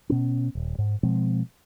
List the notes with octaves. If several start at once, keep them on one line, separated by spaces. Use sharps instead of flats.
B2 B3 C#4
D#1
G#2
B2 F3 G#3 C4